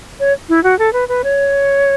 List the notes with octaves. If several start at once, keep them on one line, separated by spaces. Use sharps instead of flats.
C#5
E4
F#4
A4
B4
B4
C#5